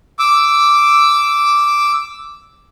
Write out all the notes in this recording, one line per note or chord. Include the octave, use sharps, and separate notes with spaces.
D6 E6